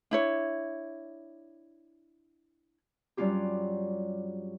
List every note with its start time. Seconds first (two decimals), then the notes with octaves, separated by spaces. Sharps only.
0.11 D4 E4 C#5
3.17 G2 F#3 G3 C#4 F4 G4